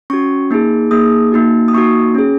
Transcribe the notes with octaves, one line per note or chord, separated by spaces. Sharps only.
C#4 F#4 C#6
A#3 D#4 G#4
A#3 D#4 G#4 D#6
A#3 D#4 F#4
D#6
A#3 D#4 F#4 C#6
C#4 G#4